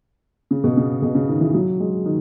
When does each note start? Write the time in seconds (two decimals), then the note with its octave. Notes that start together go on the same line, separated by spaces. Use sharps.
0.51 C#3
0.64 B2
0.77 C#3
1.02 B2
1.15 C#3
1.29 D#3
1.41 E3
1.54 F#3
1.80 G#3
2.06 D#3